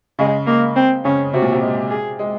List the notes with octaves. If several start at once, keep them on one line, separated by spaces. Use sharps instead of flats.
C#3 G#3
G#3 A#3
C4
C#3 C#4
C3 F#4
A#2
C3
G#3
G#4
G#3